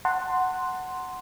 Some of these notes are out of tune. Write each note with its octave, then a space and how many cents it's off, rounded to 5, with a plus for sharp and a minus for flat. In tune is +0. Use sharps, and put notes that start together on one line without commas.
F#5 +0 A5 +35 C6 +0